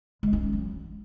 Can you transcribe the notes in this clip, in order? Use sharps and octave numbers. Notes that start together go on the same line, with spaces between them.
G#3
D#4
C#4
F#3